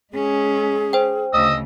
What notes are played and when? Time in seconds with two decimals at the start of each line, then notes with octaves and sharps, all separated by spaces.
0.13 G#3 C#4 G#4
0.93 C5 G5
1.34 D2 C#3 D#5 D#6 E6